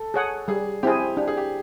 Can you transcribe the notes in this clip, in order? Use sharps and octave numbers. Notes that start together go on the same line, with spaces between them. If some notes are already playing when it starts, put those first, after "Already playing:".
Already playing: A4
G#4 C#5 F#5
G3 G#4
C4 E4 G4 G#4
D4 G4
G#4
G4